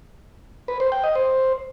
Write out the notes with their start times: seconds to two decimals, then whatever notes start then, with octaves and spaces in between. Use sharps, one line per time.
0.68 B4
0.80 C5
0.92 G5
1.04 D#5
1.15 C5